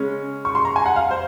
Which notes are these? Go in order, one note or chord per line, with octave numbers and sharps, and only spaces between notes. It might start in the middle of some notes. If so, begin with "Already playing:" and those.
Already playing: C#3 G#3 C#4
C#6
C6
A#5
G#5
F#5
F5
C5